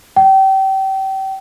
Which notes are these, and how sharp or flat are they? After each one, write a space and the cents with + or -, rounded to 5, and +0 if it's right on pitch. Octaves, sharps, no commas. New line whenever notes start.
G5 -30